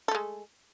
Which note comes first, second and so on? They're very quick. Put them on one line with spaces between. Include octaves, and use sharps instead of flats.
A4 A3 G#3